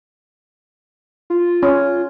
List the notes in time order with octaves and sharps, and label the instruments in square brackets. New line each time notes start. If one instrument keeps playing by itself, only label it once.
[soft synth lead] F4
[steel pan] C#4